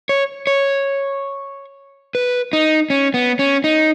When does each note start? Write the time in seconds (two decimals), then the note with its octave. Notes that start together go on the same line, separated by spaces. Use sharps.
0.09 C#5
0.47 C#5
2.15 B4
2.53 D#4
2.90 C#4
3.14 B3
3.39 C#4
3.64 D#4